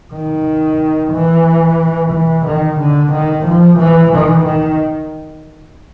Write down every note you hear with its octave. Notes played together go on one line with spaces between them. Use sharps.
D#3
E3
E3
D#3
D3
D#3
F3
E3
E3
D#3